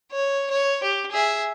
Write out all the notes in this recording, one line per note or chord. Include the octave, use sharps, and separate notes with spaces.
C#5
C#5
G4
G#4 E5